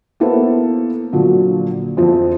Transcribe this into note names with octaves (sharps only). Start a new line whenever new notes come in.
A#3 B3 E4 A4 B4 C5
A#2 D3 F3 F#3
F2 E3 F3 C4